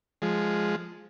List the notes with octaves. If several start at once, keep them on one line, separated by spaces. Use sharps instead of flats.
F3 G#3